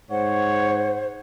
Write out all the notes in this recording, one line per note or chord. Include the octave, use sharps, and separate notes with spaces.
G#2 C5 C#5 F#5